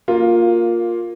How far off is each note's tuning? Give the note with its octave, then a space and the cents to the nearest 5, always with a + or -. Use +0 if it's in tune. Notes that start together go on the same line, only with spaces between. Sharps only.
A#3 +0 F4 +10